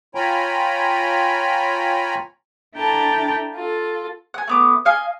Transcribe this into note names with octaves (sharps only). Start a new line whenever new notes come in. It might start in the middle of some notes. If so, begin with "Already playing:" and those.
F4 C#5 G5 G#5 A#5 B5
D4 E4 A4 G5 A5 A#5
F4 A4
F#5 G#5
A3 B3 D6
D#5 F5 G#5